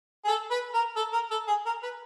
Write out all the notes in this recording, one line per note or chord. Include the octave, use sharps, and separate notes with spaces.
G#4
A4
B4
A#4
A4
A#4
A4
G#4
A#4
B4